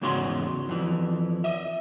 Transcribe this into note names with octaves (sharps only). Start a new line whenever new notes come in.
E2 G#2 C#3 F#4 F5 C6
F2 E3
D#5 E5